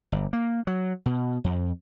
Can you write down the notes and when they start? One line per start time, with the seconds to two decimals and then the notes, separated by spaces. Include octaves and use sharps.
0.12 G1
0.33 A#3
0.67 F#3
1.06 B2
1.44 F2